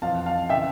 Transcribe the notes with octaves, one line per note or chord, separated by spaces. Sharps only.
F2 F5 A5
E3
F5 A5
C#3 E3 E5 G5